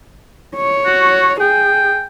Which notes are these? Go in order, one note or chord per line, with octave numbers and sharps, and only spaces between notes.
C#5
F#4
G#4 G5